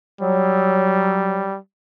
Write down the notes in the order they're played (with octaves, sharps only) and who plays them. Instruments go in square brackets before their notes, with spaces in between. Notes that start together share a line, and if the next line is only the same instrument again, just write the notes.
[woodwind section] F#3 [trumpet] G3